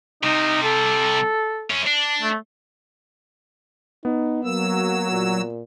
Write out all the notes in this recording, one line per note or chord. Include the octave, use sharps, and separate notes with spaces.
C3 G3 D#4
A4
F#2 C#4
D4
A3
B3 D#4
F#3 A#3 E6
A#2